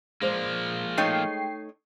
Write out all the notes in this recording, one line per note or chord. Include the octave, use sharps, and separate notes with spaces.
F3 G#3 A#3 C5 D5
A3 D#4 C#5 G5 C7